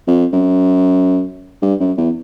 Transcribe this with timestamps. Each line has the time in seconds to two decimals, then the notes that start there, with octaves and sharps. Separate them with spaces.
0.07 F2
0.32 F#2
1.62 G2
1.80 F#2
1.97 E2